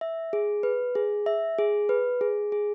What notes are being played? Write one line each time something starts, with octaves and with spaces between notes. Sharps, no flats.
E5
G#4
B4
G#4
E5
G#4
B4
G#4
G#4